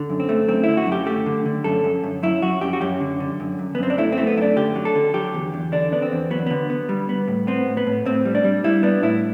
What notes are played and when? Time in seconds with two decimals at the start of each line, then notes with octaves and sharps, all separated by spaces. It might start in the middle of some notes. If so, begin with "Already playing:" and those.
Already playing: D3
0.10 F#2
0.20 C4
0.29 A3
0.48 F#2 C4
0.63 D3 E4
0.77 F#4
0.87 F#2 G4
1.06 A3 G4
1.26 D3
1.46 D3
1.64 F#2 A4
1.84 F#2
2.04 F#2
2.23 F#2 E4
2.42 F#2 F#4
2.61 F#2 G4
2.73 F#4
2.81 F#2 G4
3.01 D3
3.20 D3
3.40 F#2
3.59 F#2
3.75 B3
3.78 F#2 C4
3.90 D4
3.98 A3 E4
4.12 C4
4.18 A3
4.27 B3
4.37 F#2 E4
4.42 D4
4.56 D3 G4
4.76 F#3
4.85 A4
4.95 D3
5.14 F#3 G4
5.34 E2
5.54 E2
5.72 D3 D4
5.92 B3 D4
6.02 C4
6.12 E2
6.30 F#3 B3
6.46 D3 B3
6.70 B3
6.89 G3
7.09 B3
7.28 A2
7.47 B3 C4
7.66 A2
7.77 B3
7.87 A2
8.06 A2 C4
8.25 G3
8.35 D4
8.45 G3
8.64 G3 E4
8.83 B3 D4
9.03 A2 E4